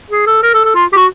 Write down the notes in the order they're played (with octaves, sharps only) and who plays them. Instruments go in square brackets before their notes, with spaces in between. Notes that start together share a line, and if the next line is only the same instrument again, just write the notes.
[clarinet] G#4
A4
A#4
A4
A4
F4
G4
F#4